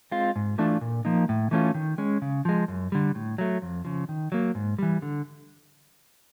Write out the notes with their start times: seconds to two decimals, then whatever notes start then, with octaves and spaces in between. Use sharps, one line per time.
0.11 G#3 C4 F4
0.36 G#2
0.58 E3 A3 D4 F4
0.81 A#2
1.05 F3 A#3 D#4
1.29 A2
1.51 E3 A3 C#4 F4
1.75 D#3
1.98 G#3 C#4
2.22 C#3
2.45 F3 G#3
2.68 F#2
2.92 D3 G3
3.15 A2
3.38 F#3 A3
3.62 F2
3.85 C#3 F3
4.09 D#3
4.32 F#3 A#3
4.55 G#2
4.79 E3 G3
5.02 D3